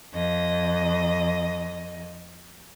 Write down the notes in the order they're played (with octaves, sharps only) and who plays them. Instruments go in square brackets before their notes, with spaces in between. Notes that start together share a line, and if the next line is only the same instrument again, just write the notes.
[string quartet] F2 D#5